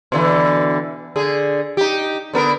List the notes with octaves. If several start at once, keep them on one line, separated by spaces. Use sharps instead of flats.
B2 D3 E3
D3 G#4
D#4 G4
D3 B3 A#4